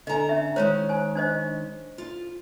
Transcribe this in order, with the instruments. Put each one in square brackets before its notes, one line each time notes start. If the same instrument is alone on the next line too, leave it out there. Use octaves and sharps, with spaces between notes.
[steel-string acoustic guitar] D3 A#5 [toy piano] D#5 G#5
[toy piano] C#4 E5
[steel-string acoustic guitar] D#3 G#3 C#4 [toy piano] C5 C#5 A#5
[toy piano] C5 G#5
D4 C5 D#5
[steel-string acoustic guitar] F4